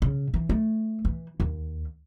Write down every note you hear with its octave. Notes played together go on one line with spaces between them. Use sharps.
C#3
E3
A3
E3
D#2